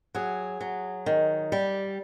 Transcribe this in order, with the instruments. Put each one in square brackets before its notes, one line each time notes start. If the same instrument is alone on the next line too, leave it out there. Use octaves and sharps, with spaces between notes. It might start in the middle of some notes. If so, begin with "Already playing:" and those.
[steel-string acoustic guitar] F#3 G#4
F#3
D#3
G3